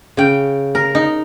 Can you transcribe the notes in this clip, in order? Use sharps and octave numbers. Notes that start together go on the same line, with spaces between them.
C#3 G5
A#4
D#4